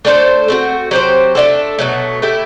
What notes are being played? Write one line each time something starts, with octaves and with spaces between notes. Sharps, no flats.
A3 D4 A4 C5
A3 C4 F#4
F#3 C4 G4 C5
A3 D4 F#4 A4
B2 F#3 A3
A3 E4 G4